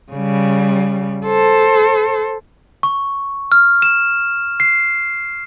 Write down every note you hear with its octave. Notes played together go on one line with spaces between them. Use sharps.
C#3 G3
A4 C5
C#6
F6
E7
C7